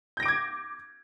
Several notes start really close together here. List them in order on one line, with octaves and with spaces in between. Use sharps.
G6 A#6 D7 D6 G#6